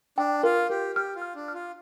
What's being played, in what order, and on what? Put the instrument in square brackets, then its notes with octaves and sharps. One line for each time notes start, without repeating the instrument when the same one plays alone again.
[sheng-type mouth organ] D4 [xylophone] G5
[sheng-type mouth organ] F4 [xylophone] A#4
[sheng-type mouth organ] G4 [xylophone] A#4
[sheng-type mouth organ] G4 [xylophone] F6
[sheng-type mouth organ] F4
[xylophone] F6
[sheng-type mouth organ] D4
[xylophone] F6
[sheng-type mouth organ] F4